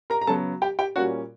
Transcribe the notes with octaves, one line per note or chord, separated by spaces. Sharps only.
A#4 A#5
A#5
C#3 F#3 B3 A4 A5
G4 G5
G4 G5
A#2 G3 A#3 C#4 F#4 F#5